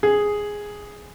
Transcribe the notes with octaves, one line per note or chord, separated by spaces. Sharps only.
G#4